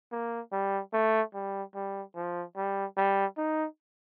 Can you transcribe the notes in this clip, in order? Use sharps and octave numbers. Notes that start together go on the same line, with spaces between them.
A#3
G3
A3
G3
G3
F3
G3
G3
D#4